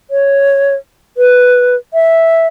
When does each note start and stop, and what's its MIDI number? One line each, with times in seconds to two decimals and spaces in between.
0.11 0.75 73
1.17 1.76 71
1.94 2.47 76